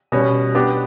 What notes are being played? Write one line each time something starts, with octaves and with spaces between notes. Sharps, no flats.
B2 G3 C#4
B3 D4 G4 D5